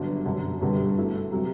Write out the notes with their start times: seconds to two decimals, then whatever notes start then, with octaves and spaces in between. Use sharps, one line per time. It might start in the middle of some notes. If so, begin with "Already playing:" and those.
Already playing: G1 G2 D3 F#3
0.26 F#2 D3 F#3
0.61 G1 G2 D3 G3
0.97 B2 A3 E4 A4
1.32 C3 F#3